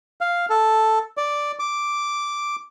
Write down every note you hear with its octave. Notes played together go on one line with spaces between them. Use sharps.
F5
A4
D5
D6